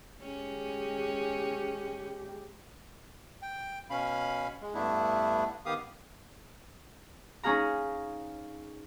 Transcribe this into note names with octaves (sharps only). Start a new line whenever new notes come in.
G#3 C#4 G4
G5
B2 C#4 F5 B5
G#3
G2 A3 B3 D4 E4
D#3 B3 G4 F5 D#6
C#4 D#4 G#4 F5 A#5